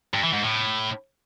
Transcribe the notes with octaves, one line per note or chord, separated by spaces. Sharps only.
G2
E3
G#2
A2